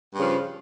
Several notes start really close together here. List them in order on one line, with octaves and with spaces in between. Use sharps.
G2 C#3 F3